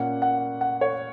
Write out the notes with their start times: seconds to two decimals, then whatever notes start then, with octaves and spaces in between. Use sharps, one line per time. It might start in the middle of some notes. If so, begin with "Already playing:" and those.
Already playing: A#2 A#3 C#4 F#5
0.22 F#5
0.61 F#5
0.81 C#5